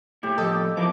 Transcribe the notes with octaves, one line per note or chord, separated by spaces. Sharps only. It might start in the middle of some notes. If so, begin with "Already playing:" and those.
A#2 A3 E4 G4
A2 F3 G4 A4 D#5
F3 B3 E4 A#4 D6